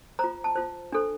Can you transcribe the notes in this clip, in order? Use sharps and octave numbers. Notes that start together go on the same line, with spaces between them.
F4 C5 A#5
A5
F4 C5
D4 A4 C5